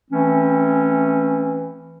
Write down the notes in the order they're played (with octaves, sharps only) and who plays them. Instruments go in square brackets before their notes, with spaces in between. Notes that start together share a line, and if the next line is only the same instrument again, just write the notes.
[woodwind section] E3 A3 C4 C#4